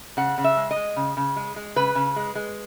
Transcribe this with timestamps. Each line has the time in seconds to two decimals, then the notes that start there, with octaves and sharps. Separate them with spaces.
0.17 C#3 F#5
0.38 C#3
0.44 E5
0.57 G#3
0.71 D#5
0.76 G#3
0.96 C#3
1.17 C#3
1.36 G#3
1.56 G#3
1.76 C#3 B4
1.95 C#3
2.16 G#3
2.35 G#3